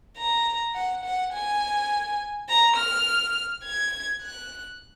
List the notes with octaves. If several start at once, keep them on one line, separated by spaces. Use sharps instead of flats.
A#5
F#5
F#5
G#5
A#5
F6
G#6
F#6